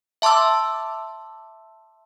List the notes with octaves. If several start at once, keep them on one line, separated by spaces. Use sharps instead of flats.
E5 A5 C6 D6 E6